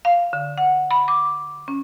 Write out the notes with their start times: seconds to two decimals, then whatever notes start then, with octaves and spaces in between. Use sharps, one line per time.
0.05 F5
0.33 D3
0.58 F#5
0.91 B5
1.08 D6
1.68 C#4